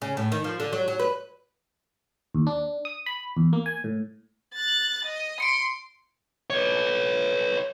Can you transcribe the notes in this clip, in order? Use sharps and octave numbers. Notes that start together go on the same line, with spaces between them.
C#3
A2
D#3
F3
D3
F#3
F#3
B4
D#2
D4
D#6
B5
E2
A#3
G#5
A2
F#6 A6
D#5
C6 C#7 D7
B4 C#5